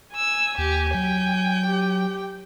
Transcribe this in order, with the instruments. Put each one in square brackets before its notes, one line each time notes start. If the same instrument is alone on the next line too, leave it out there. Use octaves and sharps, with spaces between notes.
[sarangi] G#5 [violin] E6
[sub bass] D#2 [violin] G4
[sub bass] F#3 [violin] G5
[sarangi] G4